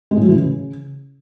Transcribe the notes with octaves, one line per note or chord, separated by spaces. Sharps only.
G#3
A2
F#3
E3
C#3